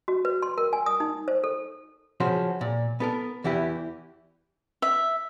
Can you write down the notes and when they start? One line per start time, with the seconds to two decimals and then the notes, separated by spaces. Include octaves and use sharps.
0.08 F#4
0.25 B4
0.42 C6
0.58 A#4
0.73 G#5
0.86 D#6
1.00 D#4
1.28 C5
1.44 A4
2.20 C#3 F3 C#4 F#4 C5
2.61 A#2
3.00 B3 A4 A#4
3.44 E2 E3 E4 G4
4.82 E5